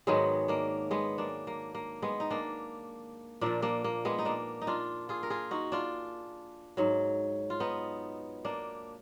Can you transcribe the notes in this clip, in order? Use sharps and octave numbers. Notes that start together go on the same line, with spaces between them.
G#2 D#3 F#3 G#3 B3
A#3 D4
G#3 B3
A#3 D4
A#3
A#3
G#3 B3
D#4
A#3 D4
A#2 F3 A#3 D4
A#3 D4
A#3
G#3 B3
D#4
A#3 D4
D#4
D4 F4
F4 G#4
A#4
F4 G#4
D#4 F#4
D4 F4
G#2 F#3
F4
B3 D#4
A#3 D4